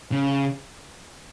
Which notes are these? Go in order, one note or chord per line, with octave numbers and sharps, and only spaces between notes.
C#3